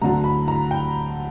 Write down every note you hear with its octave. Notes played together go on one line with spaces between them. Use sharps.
D2 D3 F#3 A#5
B5
A#5
G5